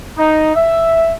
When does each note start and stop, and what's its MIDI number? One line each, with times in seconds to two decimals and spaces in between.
0.18 0.53 63
0.55 1.13 76